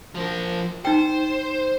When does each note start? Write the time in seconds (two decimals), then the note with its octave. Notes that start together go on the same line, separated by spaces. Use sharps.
0.15 F3 A#4
0.85 D#4 C5 G5